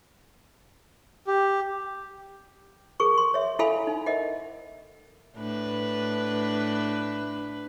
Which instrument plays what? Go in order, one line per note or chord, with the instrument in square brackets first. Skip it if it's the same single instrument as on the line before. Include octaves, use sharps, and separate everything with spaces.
[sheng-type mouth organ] G4
[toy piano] G#4 A#4 C#6
C6
C#5 E5
E4 A4 E5 F5 G#5 B5
D#4
A#4 D#5 E5 F#5
[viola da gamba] A2 D4 B4